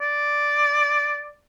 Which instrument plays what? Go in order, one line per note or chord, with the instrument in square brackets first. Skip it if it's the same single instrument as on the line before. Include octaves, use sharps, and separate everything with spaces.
[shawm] D5